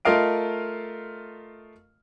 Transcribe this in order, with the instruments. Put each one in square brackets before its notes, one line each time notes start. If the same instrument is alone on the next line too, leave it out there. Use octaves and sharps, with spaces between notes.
[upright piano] A3 F4 A#4 D#5 F5 D7